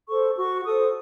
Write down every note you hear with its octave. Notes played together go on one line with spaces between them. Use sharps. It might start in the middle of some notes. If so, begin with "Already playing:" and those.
A4 C5 C#6
F#4 C#6
A4 C5 D#6